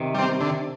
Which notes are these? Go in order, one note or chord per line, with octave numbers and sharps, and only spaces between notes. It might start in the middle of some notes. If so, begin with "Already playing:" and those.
Already playing: C3 D#3
G3 C4
D3